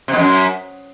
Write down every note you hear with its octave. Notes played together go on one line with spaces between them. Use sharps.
C3
B2
F#2